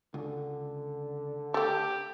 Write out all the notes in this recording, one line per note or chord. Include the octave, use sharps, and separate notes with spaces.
C#2 D3
A3 G4 A4